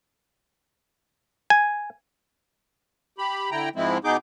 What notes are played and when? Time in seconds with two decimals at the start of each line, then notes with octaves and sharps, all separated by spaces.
1.50 G#5
3.18 G4 B5
3.51 D3 E4 G5 A#5
3.76 G#2 F3 G#3 C4 E4
4.04 B2 B3 D#4 G#4 D6 G6